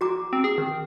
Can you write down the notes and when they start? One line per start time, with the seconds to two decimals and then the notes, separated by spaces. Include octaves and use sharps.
0.01 F#4 A#5 D6
0.33 C4
0.44 G#4
0.58 D#3